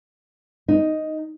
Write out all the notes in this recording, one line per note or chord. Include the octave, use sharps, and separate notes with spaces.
D#4